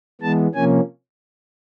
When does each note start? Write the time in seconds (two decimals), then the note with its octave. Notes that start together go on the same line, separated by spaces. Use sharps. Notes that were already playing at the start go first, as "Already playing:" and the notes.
0.22 E3 G#3 B3 A5
0.54 C3 F3 A#3 C#4 G#5